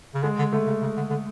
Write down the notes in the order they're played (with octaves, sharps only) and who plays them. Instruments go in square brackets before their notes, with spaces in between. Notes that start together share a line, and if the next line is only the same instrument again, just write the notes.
[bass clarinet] C#3
[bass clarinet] D3 [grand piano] G#3
[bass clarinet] D3
[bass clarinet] D3 [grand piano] A3
[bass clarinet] C#3
C#3
D3
D3